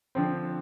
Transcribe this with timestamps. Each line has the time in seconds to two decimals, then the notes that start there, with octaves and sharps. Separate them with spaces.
0.15 D3 F3 C4